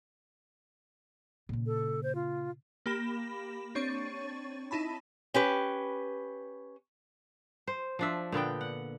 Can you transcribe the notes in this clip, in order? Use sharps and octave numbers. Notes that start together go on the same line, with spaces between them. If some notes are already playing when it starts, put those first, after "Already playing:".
A#2 C#3
A4
C5
F4
A#3 G4 B5 A#6 E7
C4 D4 C#5 C#6 A6 D#7
D#4 E4 A5 B5
C#4 G4 B4
C5
F3 D4 E5
A#2 D3 B3 G5
F#5